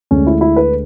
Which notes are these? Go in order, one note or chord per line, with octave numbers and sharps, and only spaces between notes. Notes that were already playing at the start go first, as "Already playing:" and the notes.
D2 D3 G#3 C#4
E4
E4
B4